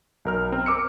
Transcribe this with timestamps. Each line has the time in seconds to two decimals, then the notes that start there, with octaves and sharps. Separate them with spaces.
0.25 B1 A#4 F6
0.52 C4
0.66 A#4 D6 E6 C#7